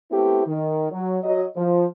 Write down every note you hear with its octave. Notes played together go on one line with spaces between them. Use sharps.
A3 B3 C4 E4 G4
D#3
F#3
F#3 D#5
F3